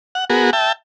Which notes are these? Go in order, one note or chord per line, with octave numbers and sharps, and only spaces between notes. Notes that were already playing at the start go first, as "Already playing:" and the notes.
F#5
B3 F#4 G#4 A#4
E5 G5 A5